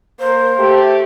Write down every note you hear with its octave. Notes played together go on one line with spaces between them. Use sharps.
A#3 A#4 C5
A3 G4